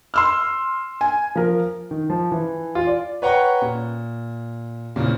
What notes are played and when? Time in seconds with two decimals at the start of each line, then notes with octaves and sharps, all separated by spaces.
0.14 C6 E6 F6
1.01 G#5
1.36 F3 A#4
1.91 D#3
2.10 F3
2.31 E3
2.75 F4
2.87 D5
3.22 B4 C#5 F#5 G5 A#5 C#6
3.62 A#2
4.96 A#2 C#3 E3 C4